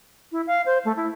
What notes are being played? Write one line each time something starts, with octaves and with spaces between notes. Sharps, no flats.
E4
F5
C5
A3
E4